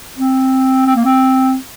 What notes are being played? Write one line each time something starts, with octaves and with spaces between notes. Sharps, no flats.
C4
C4
A#3
C4